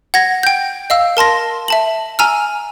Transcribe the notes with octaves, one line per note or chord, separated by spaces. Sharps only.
F#5 G#6 A#6
G5 G6
D#5 F5 E6
A#4 A5 C6 A#6
E5 A5 F#7
G#5 A#5 E6 F6